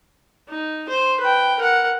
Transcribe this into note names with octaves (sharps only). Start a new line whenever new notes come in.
D#4
C5
B4 G5
A#4 F#5